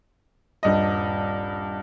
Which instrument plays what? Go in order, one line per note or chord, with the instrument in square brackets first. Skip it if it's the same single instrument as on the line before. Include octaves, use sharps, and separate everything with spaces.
[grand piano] D#1 G2 D#5